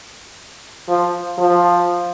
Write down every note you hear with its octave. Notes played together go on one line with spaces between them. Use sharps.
F3
F3